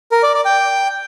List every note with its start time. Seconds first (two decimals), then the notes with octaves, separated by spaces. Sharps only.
0.12 A#4
0.23 D5
0.34 D5
0.45 G5